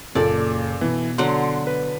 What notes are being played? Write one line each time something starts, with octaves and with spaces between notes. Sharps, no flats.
F#1 A#2 A4 D5
B2 E3
D3 F#3 F#5 C6
B4